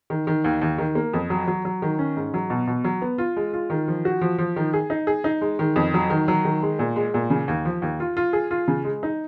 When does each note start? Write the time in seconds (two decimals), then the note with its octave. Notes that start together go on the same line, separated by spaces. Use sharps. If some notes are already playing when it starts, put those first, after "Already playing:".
0.10 D#3
0.27 D#3
0.44 D#2
0.61 D#2
0.78 D#3
0.95 A#3
1.14 F2
1.30 F#3
1.48 F#3
1.65 F#3
1.82 D#3
1.99 C#4
2.17 G#2
2.34 F#3
2.50 B2
2.67 B2
2.84 F#3
3.02 B3
3.18 F4
3.36 G#3
3.53 F4
3.70 D#3
3.88 F3
4.05 F#4
4.21 F3
4.38 F3
4.56 D#3
4.73 G#4
4.90 D#4
5.07 G#4
5.24 D#4
5.41 G#3
5.59 D#3
5.76 F2
5.94 F#3
6.10 D#3
6.28 F#3
6.45 D#3
6.63 G#3
6.79 A#2
6.96 G#3
7.14 A#2
7.30 C#3
7.48 D#2
7.65 F3
7.82 D#2
8.00 F4
8.17 F4
8.33 G#4
8.51 F4
8.68 C#3
8.85 G#3
9.03 D#4